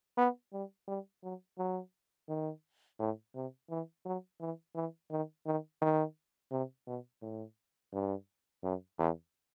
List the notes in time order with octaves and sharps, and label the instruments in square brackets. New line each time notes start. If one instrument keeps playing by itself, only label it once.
[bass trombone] B3
G3
G3
F#3
F#3
D#3
A2
C3
E3
F#3
E3
E3
D#3
D#3
D#3
C3
B2
A2
G2
F#2
E2